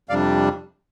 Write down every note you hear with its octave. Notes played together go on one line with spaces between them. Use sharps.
F2 C3 G3 D4 D5 F5